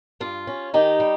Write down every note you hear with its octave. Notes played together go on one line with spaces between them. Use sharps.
G2 F4
C#4
D#3 D#4 G4
G3